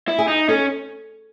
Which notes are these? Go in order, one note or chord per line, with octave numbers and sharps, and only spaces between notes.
E4
G#4
D#4
C#4 A4